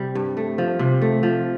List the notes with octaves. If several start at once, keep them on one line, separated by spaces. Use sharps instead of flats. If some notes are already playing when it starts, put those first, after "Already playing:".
Already playing: C3 G3
G2
A3
F3
C3
A3
F3